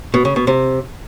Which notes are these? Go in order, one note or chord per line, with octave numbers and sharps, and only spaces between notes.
B2
C#3
B2
C3